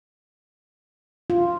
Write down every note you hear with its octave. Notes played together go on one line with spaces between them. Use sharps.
F4